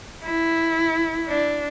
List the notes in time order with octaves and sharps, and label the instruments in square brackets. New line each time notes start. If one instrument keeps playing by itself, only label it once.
[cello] E4
D4